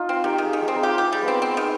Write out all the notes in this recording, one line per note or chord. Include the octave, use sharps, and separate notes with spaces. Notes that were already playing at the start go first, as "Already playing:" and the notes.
Already playing: D#4 F4
C4
D#3 G4
D#3 G#4
D#3
G#4
C4
D#4
F4 G4
G4
G3
B3 C4
C4
D#3